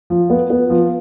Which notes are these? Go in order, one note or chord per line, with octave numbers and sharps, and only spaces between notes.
F3
B3
B3
F3